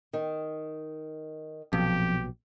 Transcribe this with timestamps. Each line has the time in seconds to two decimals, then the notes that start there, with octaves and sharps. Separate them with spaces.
0.13 D#3
1.73 A#1 F2 B2 F#3 G4